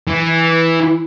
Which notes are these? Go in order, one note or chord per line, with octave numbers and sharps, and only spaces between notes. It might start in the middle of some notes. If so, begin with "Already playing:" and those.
E3